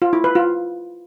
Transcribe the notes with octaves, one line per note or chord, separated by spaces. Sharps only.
F4
E4
B4
F4